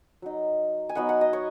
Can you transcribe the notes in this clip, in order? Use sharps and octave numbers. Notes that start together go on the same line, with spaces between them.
F#3 D#4
G#5
F#3 B3 D#4 F#5
F#5
D#5
C#5